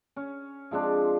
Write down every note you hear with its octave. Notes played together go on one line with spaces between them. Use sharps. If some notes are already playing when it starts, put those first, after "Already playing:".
C#4
F3 G#3 C4 D4